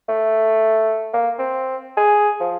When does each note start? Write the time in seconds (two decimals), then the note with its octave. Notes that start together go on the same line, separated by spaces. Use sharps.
0.09 A3
1.13 A#3
1.39 C4
1.97 G#4
2.41 F3